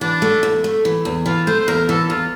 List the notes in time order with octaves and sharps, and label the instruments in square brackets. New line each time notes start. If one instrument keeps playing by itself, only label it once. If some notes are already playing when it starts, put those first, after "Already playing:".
[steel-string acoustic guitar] E3 [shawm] D4
[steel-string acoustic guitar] A3
E2
A3
E3
E2
[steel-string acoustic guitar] E3 [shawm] F4
[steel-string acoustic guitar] A3 [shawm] C5
[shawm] C5
[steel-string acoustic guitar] E2 [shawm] A#4
[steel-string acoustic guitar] E3 [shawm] A4
[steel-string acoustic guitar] E2 [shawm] F4